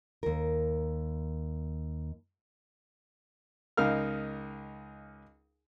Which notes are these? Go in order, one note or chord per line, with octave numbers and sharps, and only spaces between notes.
D#2 A#4
C#2 D#4 A#4 F5 F6